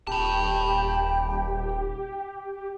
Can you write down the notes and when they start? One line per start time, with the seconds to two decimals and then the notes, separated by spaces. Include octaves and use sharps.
0.07 D#1 G4 G5 A5 B5